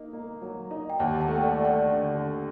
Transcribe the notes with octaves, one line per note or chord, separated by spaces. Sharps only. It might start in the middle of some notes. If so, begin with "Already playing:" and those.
Already playing: A#3 D#4
A#3
F#3
D#4
G5
D#2 F#5 A5
F#5 A5
A3
G5
D5 F#5
A3
D5 F#5
D3
D3